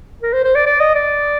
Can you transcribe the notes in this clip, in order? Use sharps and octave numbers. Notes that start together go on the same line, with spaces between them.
A#4
C5
C5
D5
D5
D#5
D5